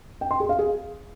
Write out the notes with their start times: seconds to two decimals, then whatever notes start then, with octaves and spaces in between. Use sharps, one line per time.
0.21 G5
0.31 C6
0.40 G#4
0.49 F5
0.59 G#4